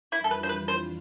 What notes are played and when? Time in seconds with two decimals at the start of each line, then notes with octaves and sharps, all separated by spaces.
0.12 F2 E3 G3 D4 E4 F4
0.24 A4
0.31 B4
0.43 C5
0.49 B4
0.68 C5